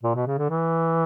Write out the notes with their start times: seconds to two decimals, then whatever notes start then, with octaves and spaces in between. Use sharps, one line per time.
0.03 A#2
0.15 B2
0.27 C#3
0.38 D3
0.50 E3